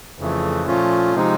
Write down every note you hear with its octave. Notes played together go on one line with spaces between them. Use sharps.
F2 C#3 E3 A3
A#2 F3 A3 C#4 F4
C3 F3 G#3 C4 D#4